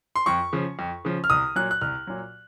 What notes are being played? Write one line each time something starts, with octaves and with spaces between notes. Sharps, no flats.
C6
F2 C#6
C#3 F3
F2
C#3 F3
F6
C2 D#6
A#2 F#3 F#6
F#6
C2 F6
A#2 F#3